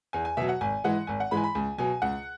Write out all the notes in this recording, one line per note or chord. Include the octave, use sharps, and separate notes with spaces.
E2 G#5
G#5
B2 F#3 E5
F#5
G#1 G#5
G#2 E3 G#3 F#5
G#1 G#5
F#5
G#2 E3 G#3 B5
G#5
B5
C#2 G#5
B2 F#3 G#5
C#2 F#5